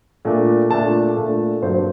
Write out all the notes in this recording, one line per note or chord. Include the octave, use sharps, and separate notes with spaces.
A#2 A3 D4
A#2 A3 D4 A5
A#2 A3 D4
G2 F#3 A#3 D4 C5